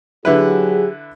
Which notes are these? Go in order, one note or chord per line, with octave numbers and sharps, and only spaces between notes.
D3 F#3 E4 G4 G#4 B4